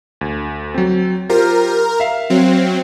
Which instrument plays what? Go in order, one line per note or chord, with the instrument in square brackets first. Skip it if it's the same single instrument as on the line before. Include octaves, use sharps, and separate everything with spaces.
[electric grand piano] D2
F#3 C4
[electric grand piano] F4 G4 C5 [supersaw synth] A#4
[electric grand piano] E5 F5
[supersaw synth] F#3 C4